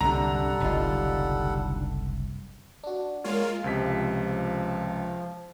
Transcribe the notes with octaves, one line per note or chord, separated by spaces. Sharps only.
C2 F#2 D3 G3 D4 A4 F#5 A#5
F#1 C2 D3 D#4 F4
D4 F#4
G#3 A#3 F4 C#5 F6
C#2 C3 F3 B6